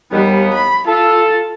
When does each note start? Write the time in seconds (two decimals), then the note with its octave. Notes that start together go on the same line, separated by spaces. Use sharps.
0.12 D#2 G3 B3
0.54 B5
0.88 F4 A4